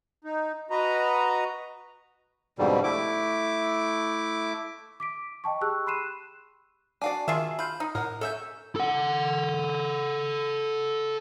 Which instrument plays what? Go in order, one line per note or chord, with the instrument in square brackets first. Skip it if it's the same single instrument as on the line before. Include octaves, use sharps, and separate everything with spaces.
[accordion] D#4
F#4 B4 D#5 A#5
[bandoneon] F2 G#2 B2 D3 G3
A3 E4 D6
[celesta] D6 B6 D7
D#5 G5 A5 C#6
G4 G#4 C#6 E6 F#6
B5 C6 F#6 C7 D#7 E7
[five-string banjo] D4 F#4 D5 [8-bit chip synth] F5 G#5
[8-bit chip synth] D#3 [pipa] F4 G#4 E5
[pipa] F4 [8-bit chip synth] B5 G6
[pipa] D#4
[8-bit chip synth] A2 [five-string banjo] A#4 F#5
[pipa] C#3 E5 [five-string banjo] C#4 C#5 G#5 [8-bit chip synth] A4 G6
[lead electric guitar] A4 F#5